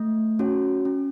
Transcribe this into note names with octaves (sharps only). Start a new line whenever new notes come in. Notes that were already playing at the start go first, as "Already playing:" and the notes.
Already playing: A3
C#4 F#4 C#5
C#4